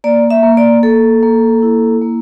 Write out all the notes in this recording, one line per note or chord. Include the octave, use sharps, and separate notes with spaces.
A#3 D5
E5
A#3
D5
A#3 A4
A#3
E4
A#3